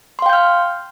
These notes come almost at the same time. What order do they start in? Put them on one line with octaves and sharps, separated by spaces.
C6 F5 G5 G6 F6